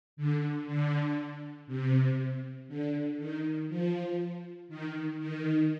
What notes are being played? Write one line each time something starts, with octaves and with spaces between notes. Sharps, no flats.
D3
D3
C3
D3
D#3
F3
D#3
D#3